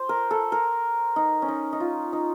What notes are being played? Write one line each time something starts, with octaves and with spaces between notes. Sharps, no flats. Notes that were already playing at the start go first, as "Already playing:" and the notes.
Already playing: C5
A#4
A4
A#4
D#4
C#4
D#4
D#4
F4
D#4